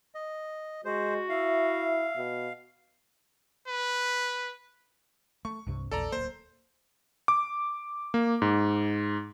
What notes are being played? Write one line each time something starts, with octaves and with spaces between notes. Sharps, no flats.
D#5
G#3 F#4 C5
E4 E5 F5
B2
B4
A3 C#6
C2 G2 C3
A#1 E2 A4 D5 A#5
D1 A#3 C5
D6
A#3
G#2